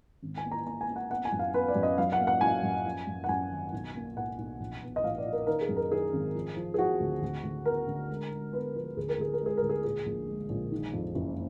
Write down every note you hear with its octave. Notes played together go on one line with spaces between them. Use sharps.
G#1
G#5
A#3
A#5
A#3 A#5
G#5
A#3
F#5
B3 F#5
G#5
F#2
F5
B3 B4
D5
F#2
D#5
F#3 F5
F#5
A#3
F#5
F#3 G#5
F#2
F3
F#2
F#5
F#2 G#5
G#1
B1
A#3
B1 F#5
B1
A#1
B3
D#5
A#1 F5
D5
A#2
A#4
D#3 A#4
G#4
F#2
A#4
D#3 G#4
G#1
F3
F3
G#4
F3 F#4
D2
D2
D2
B3 A#4
D3
G#3
G#3
B3 B4
F3 A#4
D2 G#4
A#4
D2 G#4
A#4
G#3
G#4
A#4
D2
G#4
A#2 G#4
A#1
G#3
A#1
D#3
F2
F#1